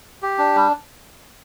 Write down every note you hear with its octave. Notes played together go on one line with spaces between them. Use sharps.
G4
D4
G3